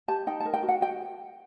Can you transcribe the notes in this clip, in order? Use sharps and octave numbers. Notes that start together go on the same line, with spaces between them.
G4 A5
D#4 G5
A5
A#4
G5
F#4
F#5
F#4 G5